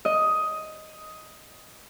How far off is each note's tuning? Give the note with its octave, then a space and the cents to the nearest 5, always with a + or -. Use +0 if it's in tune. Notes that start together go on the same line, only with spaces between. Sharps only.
D#5 +10